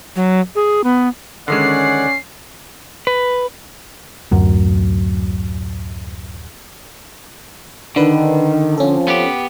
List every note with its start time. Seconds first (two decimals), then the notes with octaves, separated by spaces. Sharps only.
0.16 F#3
0.55 G#4
0.84 B3
1.48 D3 D#3 G#3 C#4 C#5 D5 F#5 C7
3.07 B4
4.31 D1 F#2
7.96 D3 D#3 D4 B4
8.78 F3 C4 C#4 F4 A4
9.08 B3 G4